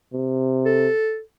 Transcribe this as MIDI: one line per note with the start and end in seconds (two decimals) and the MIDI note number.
0.13 0.88 48
0.65 1.20 69